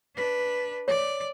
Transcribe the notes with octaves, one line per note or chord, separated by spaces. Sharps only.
D4 B4
C#5 D5